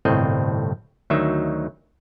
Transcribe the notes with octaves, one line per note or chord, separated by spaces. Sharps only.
G1 C2 A2 C4 D#5
D2 D#3 F#3 D#4 E5